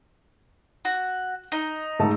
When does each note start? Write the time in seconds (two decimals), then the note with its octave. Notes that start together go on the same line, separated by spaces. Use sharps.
0.85 F#4
1.52 D#4
1.99 G#2 A3 A5